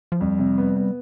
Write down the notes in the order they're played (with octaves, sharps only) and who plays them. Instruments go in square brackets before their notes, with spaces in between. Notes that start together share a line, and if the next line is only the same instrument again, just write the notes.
[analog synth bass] F3
[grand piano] F2 [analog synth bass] G3
[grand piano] C3
B3
B3